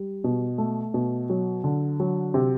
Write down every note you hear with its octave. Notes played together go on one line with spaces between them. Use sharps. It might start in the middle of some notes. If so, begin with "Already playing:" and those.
Already playing: G3
B2
A3
B2
F#3
D3
F#3
C3